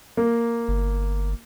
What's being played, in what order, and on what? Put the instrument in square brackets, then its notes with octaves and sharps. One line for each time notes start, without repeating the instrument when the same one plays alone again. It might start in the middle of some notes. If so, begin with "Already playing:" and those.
[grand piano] A#3
[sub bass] G1